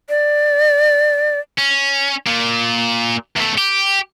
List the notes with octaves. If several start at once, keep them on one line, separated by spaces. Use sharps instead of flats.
D5
C#4
A#2 A#3
E2 A3
G4